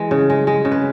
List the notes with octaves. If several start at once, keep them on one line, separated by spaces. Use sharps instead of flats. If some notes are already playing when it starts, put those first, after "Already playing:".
Already playing: E3 G#3
C#3
G#3
G#3
C#3
B4